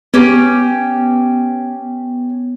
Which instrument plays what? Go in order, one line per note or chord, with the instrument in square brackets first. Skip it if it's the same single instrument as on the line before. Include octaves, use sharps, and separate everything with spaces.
[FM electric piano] B3 [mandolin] C#4 G4